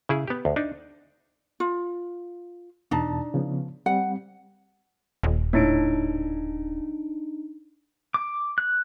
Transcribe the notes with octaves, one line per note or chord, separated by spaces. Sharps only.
C#3 E4 G#4
B3 G4
D2
D4 D#4
F4
E2 B2 D4 D#4 A5
C#3 F3 B3
G3 C4 F#5
D#1
A2 D4 D#4 D7
D6
F#6